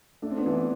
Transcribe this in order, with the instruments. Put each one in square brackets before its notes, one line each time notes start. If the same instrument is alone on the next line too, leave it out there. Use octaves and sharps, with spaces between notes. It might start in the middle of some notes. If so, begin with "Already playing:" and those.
[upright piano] A3 [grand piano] D4
[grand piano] C4
B3 D4
[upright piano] E3